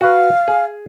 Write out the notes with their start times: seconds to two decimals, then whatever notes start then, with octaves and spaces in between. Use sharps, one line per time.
0.01 F#4 B4 F5
0.48 G#4